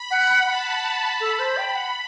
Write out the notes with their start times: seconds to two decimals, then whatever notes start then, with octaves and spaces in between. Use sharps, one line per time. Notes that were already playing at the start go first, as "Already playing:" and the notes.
Already playing: B5
0.11 F#5
0.47 F#5 A5
1.20 A4 B5
1.39 C5
1.57 G5
1.75 F#5